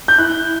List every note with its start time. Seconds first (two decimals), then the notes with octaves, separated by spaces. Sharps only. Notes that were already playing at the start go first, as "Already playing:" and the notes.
0.08 G6
0.18 E4 F#6